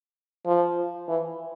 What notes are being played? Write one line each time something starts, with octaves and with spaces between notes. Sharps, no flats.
F3
E3